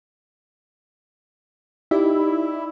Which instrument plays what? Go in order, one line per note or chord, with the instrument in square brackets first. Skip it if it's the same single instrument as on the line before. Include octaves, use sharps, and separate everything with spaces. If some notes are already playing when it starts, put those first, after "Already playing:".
[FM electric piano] D#4 G4 D5 [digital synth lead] E4